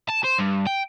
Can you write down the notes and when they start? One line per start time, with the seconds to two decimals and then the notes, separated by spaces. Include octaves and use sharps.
0.09 A5
0.24 C5
0.38 G2
0.67 G5